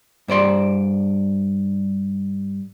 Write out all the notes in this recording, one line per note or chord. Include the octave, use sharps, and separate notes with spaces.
G2 C5 D5 C6